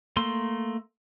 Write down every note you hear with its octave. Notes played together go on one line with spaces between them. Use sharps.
A3 A#3 C6